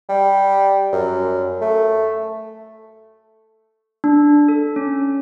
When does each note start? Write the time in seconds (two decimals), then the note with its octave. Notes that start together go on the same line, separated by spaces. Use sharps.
0.09 G3
0.93 F#2
1.61 A3
4.04 D4
4.48 A4
4.76 C#4